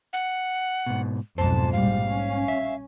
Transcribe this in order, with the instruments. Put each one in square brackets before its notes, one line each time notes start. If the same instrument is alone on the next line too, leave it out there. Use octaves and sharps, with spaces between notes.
[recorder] F#5
[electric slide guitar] G#2 B2
[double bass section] B1 F2 [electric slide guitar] G#2 C5 [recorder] A5
[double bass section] A#1 G3 G#3 [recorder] F5
[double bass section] C#4
[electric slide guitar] E5